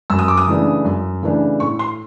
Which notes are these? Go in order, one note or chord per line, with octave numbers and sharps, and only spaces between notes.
F#2 E6
D#6
D6
D#6
C#3 E3 A3 D4
F#2
C#3 E3 A3 D4
A2 C#6
C6